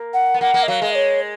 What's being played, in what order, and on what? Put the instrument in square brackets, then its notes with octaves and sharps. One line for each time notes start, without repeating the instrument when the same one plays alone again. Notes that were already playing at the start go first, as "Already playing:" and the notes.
Already playing: [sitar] A#3
[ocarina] F#5
[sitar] B3
[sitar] A#3 [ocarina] F#5
[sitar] A#3
[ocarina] D#5
[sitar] F#3 [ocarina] F5
[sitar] G#3
[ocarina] D#5
C#5